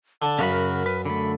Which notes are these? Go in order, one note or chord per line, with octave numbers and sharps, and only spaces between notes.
D3 A5
F#2 C#3 F#4 F5 B5
A#4
B4
D3 A3 B5